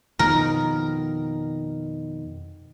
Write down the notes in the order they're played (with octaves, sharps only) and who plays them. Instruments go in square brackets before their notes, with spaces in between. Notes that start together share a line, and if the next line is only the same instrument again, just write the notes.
[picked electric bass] F2 B2 D#3 [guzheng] A#4